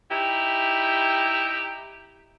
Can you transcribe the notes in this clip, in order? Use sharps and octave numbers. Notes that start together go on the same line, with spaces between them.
D#4 E4 G4